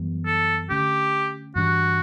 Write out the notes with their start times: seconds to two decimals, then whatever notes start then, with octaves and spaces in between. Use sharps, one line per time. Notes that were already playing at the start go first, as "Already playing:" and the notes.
Already playing: F#2 E3 G3 B3
0.26 A4
0.70 D3 A3 C#4 G4
1.56 G2 E3 G3 D4 F#4